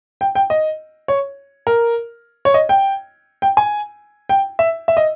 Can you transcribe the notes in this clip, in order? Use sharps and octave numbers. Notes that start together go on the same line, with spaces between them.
G5
G5
D#5
C#5
A#4
C#5
D#5
G5
G5
G#5
G5
E5
E5
D#5